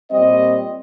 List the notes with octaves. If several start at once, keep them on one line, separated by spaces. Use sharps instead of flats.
A#2 G3 C4 D#5